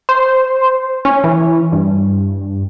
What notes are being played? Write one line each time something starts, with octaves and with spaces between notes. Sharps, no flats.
C5
C#4
E3
G2